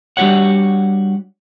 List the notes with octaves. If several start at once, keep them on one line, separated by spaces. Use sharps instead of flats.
G3 D4 F#4 G4 C#5 F#5